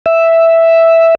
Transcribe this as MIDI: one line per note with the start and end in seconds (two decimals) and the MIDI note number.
0.06 1.15 76